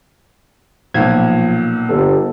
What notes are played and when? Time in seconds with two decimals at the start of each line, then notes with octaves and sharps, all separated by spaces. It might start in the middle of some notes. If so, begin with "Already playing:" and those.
0.94 B1 A#2 F3 G#6
1.89 G1 A4